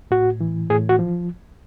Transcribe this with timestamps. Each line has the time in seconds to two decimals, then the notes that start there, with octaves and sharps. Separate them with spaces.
0.11 A2 F#4
0.41 E3
0.70 A2 G#4
0.89 F#4
0.99 F3